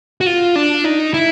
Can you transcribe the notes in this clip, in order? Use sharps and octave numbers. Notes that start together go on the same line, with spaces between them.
F#4
F4
D4
D#4
E4